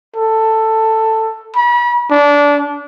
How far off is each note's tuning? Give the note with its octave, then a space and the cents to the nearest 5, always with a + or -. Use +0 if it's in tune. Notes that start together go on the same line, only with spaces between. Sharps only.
A4 +10
B5 -40
D4 -20